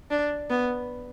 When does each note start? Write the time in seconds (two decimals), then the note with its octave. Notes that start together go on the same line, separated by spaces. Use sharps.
0.11 D4
0.50 B3